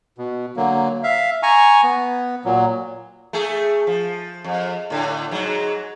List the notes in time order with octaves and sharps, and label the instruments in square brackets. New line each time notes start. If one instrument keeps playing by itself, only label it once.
[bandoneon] B2
D3 F#3 A#3
E5 F5
G#5 A#5 C#6
B3
A#2 F#3
[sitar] A3 G#4
F3
F2
A2 D3
G#2 F#3